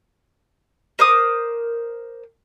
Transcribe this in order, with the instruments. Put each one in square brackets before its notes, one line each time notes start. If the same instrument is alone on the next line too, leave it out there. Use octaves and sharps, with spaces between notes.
[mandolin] A#4 C5 D6 D#6